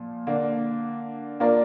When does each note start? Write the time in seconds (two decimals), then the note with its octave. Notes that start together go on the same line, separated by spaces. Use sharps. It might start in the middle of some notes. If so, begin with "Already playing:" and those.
Already playing: A#2 F3
0.27 D3 A#3 D4
1.40 A#3 D4 F4 A#4 D5